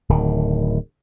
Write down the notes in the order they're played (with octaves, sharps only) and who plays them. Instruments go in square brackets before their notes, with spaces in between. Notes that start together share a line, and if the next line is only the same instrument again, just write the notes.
[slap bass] D1 D#3